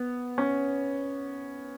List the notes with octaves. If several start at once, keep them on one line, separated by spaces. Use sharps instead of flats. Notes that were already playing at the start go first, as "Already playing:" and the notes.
Already playing: B3
C#4